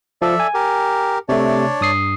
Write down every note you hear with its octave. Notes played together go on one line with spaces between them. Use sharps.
F3 A4 D5 E5
G#5
G4 A#4
C3 A3 D4 C#5 D5
G2 D#6 C7